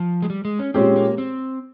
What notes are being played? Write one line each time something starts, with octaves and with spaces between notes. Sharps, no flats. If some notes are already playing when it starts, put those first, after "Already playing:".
Already playing: F3
G#3
G3
G#3
C#4
A#2 G#3 C4 C#4 G4
A#3
C4